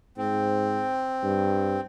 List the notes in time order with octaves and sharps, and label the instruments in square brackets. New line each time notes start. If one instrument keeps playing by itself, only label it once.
[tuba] G#2 [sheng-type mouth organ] C4
[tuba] G2